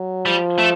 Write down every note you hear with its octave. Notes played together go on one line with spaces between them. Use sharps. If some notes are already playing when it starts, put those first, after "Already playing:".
Already playing: F#3
F3 G3
A3